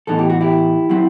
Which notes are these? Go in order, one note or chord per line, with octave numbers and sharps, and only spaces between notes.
A2 E3 B3 D#4 A4
G4
F#4
E4 G4
F#3 C4 E4